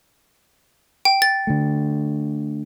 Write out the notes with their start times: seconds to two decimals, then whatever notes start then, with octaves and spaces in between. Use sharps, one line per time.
1.05 G5
1.22 A6
1.47 D3 A3